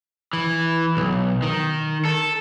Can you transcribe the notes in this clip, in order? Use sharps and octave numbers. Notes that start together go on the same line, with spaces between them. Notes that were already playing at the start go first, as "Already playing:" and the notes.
E3
B1
D#3
A4